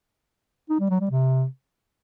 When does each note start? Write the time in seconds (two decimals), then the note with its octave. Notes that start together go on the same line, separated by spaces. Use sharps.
0.70 D#4
0.80 G3
0.90 F#3
1.01 G3
1.11 C3